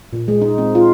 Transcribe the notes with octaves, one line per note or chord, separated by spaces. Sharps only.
A#2
G#3
D#4
C4
F4